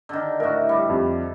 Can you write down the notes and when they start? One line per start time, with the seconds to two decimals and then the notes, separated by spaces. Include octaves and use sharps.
0.09 D3 D#3
0.40 A2 F#4 A#4
0.69 G3
0.90 F2